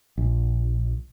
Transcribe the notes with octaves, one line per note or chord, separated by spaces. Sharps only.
A#1